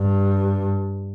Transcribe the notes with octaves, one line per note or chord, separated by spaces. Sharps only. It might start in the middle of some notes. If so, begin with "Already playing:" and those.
Already playing: G2